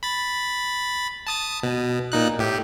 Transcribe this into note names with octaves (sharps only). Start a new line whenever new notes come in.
B5 A6
A5 D#6 A6
B2
A#2 D#4 F#6
A2 G4